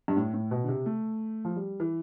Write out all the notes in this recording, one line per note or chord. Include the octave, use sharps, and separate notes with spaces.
G2
A2
A2
B2
D3
C3
A3
F3
G3
E3